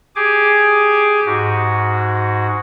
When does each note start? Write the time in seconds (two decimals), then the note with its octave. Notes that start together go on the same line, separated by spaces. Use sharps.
0.16 G4 G#4 G#5 D6
1.26 G#2 F#4